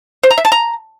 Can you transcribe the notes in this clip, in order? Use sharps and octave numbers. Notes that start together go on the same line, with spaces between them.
C5
A#5
E5
A5
A#5